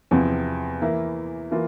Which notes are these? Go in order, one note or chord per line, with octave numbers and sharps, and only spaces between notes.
E2 C3 F3 C4
E3 A#3 E4 A#4
E3 A#3 F4